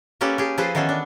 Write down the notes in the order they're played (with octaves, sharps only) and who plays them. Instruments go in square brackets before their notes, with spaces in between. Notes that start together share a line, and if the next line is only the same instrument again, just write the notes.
[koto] A#3 C#4 G4 A4 B4
G4 G#4
F3 G#4 A4 B4 C5
D#3 E3 B3 C#4 A4
D4